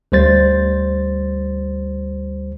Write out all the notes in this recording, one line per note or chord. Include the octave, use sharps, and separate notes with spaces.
D2 G3 C5 A6